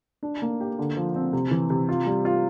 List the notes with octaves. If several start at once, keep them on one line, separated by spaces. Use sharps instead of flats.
D4
A#3
G4
D3
F3
C4
C3
E3
C3
F4
G3
F4